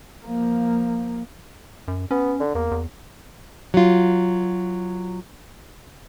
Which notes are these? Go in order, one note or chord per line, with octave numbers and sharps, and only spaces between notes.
F3 A#3
F#2
B3 C#4
D3
E2 A#3
E2
F#3 F4